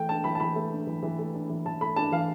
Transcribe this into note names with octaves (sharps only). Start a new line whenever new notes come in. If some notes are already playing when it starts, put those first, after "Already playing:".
Already playing: E3 A3 G5
D4 A5
E3 B5
A5
E3 B5
A3
D4
E3
E3
A3
D4
E3
E3 A5
A3 B5
D4 A5
E3 F5